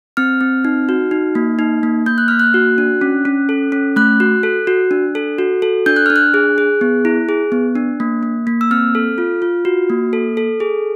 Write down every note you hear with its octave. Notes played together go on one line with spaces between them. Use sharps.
C4 F6
C4
D#4
F#4
D#4
A#3
D#4
A#3
A#3 G6
F#6
A#3 F6
F#6
F#4
D4
C#4
C#4
A4
C#4
A3 F#6
F#4
A4
F#4
D4
A4
F#4
A4
D4 G6
F#6
D4 F6
F#6
G#4
G#4
B3
E4
G#4
B3
D4
A#3
A#3
A#3
E6
C4 F6
A4
F4
F4
F#4
A#3
A4
A4
G#4